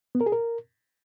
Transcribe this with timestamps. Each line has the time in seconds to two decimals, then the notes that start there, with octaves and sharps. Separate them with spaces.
0.15 B3
0.21 A#4
0.26 G#4
0.32 A#4